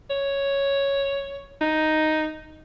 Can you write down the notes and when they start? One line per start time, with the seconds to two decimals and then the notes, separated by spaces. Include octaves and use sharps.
0.10 C#5
1.61 D#4